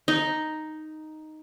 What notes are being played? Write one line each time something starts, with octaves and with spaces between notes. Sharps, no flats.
D#4